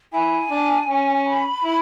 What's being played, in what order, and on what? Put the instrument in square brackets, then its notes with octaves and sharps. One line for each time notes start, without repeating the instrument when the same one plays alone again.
[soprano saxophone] E4 [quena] G#5
[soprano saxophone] D4
C#4
[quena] B5
[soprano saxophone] E4